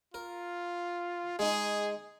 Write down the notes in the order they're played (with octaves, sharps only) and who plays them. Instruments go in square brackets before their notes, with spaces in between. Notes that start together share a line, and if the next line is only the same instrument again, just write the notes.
[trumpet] F4 [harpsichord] A#4
[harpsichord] G#3 D#4 [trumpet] G#4